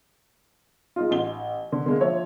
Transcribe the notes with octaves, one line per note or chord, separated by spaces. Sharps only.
G#3 D#4 F4
A1 G7
D3
D3 G#3 A#3
F3 C#5 E5